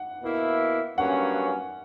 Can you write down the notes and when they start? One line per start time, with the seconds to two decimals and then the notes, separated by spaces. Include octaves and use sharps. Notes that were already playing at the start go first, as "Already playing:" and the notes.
Already playing: F#5
0.22 B2 A#3 E4
0.97 G2 F#3 A#3 C#4 F#5